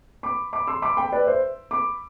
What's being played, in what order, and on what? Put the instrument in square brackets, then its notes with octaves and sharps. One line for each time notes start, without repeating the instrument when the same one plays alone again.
[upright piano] B5 D6
B5 D6
C6 E6
B5 D6
G5 B5
B4 D5
C5 E5
B5 D6